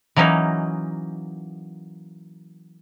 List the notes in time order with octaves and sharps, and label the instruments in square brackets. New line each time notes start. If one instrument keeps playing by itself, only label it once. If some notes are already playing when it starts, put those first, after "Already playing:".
[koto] E3 F#3 A#3 C#4 D#4